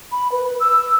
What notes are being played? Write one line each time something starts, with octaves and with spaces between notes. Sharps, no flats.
B5
B4
B4
E6